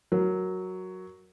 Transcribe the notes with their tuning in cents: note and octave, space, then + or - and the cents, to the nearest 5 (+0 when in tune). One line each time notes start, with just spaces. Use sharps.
F#3 +0 A#4 +0